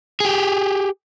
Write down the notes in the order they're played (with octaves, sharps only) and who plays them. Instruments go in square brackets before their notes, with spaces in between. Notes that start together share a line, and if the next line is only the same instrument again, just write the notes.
[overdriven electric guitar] G4 G#4